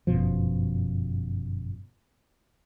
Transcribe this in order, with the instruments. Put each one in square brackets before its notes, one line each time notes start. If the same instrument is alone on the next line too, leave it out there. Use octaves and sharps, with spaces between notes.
[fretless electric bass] G1 F#2 B2 F3